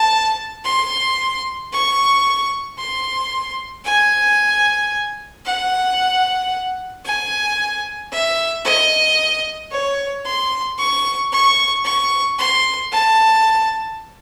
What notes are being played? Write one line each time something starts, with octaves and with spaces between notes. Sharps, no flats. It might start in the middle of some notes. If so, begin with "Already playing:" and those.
Already playing: A5
C6
C#6
C6
G#5
F#5
G#5
E5
D#5
C#5
C6
C#6
C#6
C#6
C6
A5